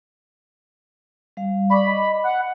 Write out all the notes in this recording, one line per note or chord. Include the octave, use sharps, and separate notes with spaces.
G3 F5
D5 B5 C#6 D6
D#5
F#5